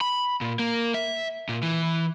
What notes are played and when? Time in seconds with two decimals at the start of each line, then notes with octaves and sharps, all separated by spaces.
0.01 B5
0.41 A#2
0.59 A#3
0.94 E5
1.49 A#2
1.62 E3